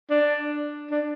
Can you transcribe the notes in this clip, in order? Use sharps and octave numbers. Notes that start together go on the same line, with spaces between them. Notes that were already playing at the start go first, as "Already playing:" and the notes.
D4
D4